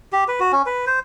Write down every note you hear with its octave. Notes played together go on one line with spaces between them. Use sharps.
G4
B4
F#4
C#4
B4
C5